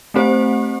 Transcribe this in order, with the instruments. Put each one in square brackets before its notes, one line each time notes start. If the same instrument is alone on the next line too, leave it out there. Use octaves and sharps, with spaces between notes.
[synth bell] A3 C4 G4 C5